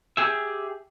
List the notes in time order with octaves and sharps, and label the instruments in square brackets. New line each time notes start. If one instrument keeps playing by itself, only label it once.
[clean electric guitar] G4 G#4 E5